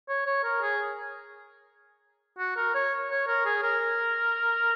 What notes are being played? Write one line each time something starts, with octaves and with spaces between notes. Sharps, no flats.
C#5
C#5
A#4
G#4
F#4
A#4
C#5
C#5
A#4
G#4
A#4